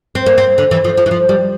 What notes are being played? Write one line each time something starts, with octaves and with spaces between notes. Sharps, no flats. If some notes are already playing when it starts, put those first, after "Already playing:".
C4
A#3
C4
D3
E3
F3
F3
E3
F3
G3